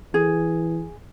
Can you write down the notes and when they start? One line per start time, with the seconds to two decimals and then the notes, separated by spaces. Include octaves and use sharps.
0.14 E3 G#4